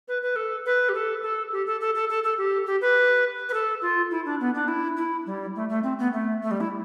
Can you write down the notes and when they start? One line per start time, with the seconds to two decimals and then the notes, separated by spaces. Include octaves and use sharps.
0.08 B4
0.22 B4
0.36 A4
0.66 B4
0.89 G4
0.95 A4
1.23 A4
1.52 G4
1.67 A4
1.81 A4
1.95 A4
2.09 A4
2.24 A4
2.38 G4
2.66 G4
2.81 B4
3.49 B4
3.54 A4
3.82 F4
4.11 E4
4.25 D4
4.40 B3
4.55 D4
4.68 E4
4.97 E4
5.26 G3
5.56 A3
5.69 A3
5.83 C4
5.99 B3
6.13 A3
6.42 A3
6.51 G3
6.61 E4